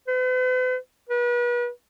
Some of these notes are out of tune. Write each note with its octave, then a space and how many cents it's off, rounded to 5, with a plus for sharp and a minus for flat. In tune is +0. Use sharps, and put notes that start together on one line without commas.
B4 +45
B4 -35